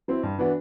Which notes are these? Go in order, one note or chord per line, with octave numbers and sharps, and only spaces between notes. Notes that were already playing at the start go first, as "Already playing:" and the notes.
F#3 C4 E4
G2
E3 B3 D4 F#4